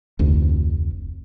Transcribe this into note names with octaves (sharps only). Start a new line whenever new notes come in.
F1 D2